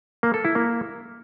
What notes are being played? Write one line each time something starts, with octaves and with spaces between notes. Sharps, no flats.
A#3
A4
E4
A#3